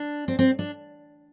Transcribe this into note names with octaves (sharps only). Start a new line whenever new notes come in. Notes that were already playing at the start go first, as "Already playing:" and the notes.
Already playing: D4
C4
C4
D4